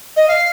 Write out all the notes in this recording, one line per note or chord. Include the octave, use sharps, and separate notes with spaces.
D#5
F5